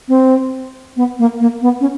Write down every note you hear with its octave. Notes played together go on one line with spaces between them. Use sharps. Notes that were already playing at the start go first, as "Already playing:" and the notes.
C4
B3
A#3
A#3
B3
C#4